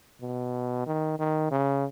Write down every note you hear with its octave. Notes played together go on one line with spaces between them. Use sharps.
B2
D#3
D#3
C#3